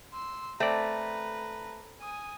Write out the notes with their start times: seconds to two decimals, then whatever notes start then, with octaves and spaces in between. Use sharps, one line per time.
0.13 C6 E6
0.60 A3 C4 B4 D5 A#5
2.01 G#5 D#6